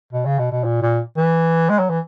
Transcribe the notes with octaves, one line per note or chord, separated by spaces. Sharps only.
B2
C#3
B2
B2
A#2
A#2
E3
G#3
F#3
E3